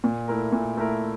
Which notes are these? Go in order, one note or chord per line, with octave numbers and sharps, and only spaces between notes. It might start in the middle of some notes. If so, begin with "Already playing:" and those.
A#2
A3 E4 A#4
A#2
A3 E4 A#4